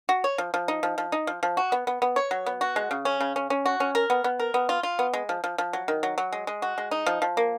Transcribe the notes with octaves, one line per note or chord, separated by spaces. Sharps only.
F#4
C#5
F3
F3
D#4
F3
F3
D#4
F3
F3
F#4
B3
B3
B3
C#5
F#3
B3
F#4
G#3
C#3
C#4
C#3
C#4
C#4
F#4
C#4
A#4
B3
B3
A#4
B3
F4
F4
B3
G#3
F3
F3
F3
F#3
D#3
F#3
F#3
G#3
G#3
F#4
G#3
D#4
F3
F3
A#3